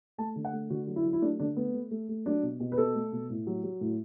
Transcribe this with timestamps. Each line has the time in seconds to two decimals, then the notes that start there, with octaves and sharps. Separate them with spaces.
0.18 A3 A5
0.36 D3
0.45 F#5
0.53 A3
0.70 D3 F#4
0.87 F#3
0.96 E4
1.05 F#3
1.13 E4
1.22 A3 D4
1.39 D3 D4
1.56 A3 B3
1.74 A3
1.91 A3
2.09 A3
2.26 F#3 D4
2.43 B2
2.60 B2
2.72 B4
2.78 B2 A4
2.95 A3
3.12 B2
3.30 A2
3.47 F#3
3.64 F#3
3.81 A2